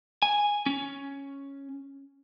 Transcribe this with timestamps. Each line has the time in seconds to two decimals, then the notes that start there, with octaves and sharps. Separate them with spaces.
0.22 G#5
0.66 C#4